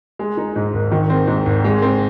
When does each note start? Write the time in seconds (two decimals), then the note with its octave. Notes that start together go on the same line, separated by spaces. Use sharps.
0.19 G#3
0.37 D#4
0.56 G#2
0.73 G#1
0.92 D#3
1.10 C4
1.27 G#2
1.46 G#1
1.64 G#3
1.82 C4